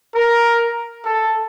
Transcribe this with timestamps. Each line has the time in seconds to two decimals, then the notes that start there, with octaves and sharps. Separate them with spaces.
0.14 A#4
1.03 A4